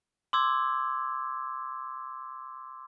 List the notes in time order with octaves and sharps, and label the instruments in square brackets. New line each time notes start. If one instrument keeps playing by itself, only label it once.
[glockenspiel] C6 D6 E6 G#6